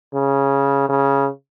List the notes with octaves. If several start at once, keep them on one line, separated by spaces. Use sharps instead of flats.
C#3
C#3